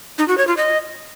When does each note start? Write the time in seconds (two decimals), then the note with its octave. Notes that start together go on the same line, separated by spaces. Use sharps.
0.18 D#4
0.28 F#4
0.38 C#5
0.47 F4
0.57 D#5